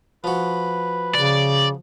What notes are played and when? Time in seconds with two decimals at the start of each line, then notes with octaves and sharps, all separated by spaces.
0.24 F3 F#4 B4
1.15 C#3 D5